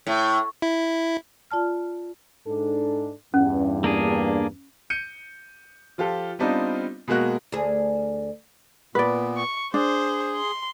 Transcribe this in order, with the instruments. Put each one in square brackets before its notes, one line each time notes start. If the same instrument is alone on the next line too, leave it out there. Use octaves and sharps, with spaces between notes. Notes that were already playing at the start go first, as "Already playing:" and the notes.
[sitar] A2
[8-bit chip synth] E4
[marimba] F4 D5 A5 F6
[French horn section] G#2 D4 A4
[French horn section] E2 G2 [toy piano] C#4
[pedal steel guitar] A#3 D4 G#4
[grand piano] G6 C#7 D#7
F3 F4 G4 A4
G3 B3 C4 D4 D#4 F4
B2 G#3 A#3 F#4 F#6
[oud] D2 G#4
[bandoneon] A#2 B3 [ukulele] B4 D5
[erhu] C#6
[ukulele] D4 [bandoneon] G#4 [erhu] C5
[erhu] C6